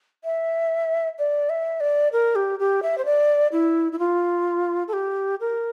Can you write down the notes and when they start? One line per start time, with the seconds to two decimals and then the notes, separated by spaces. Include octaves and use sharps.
0.24 E5
1.19 D5
1.49 E5
1.80 D5
2.12 A#4
2.35 G4
2.59 G4
2.83 E5
2.98 C5
3.05 D5
3.52 E4
3.92 E4
3.99 F4
4.88 A4
4.93 G4
5.40 A#4